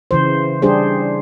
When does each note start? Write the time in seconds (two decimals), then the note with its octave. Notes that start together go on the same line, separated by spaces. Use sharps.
0.11 C#3 E3 C5
0.62 G3 D4 G4 G#4 C5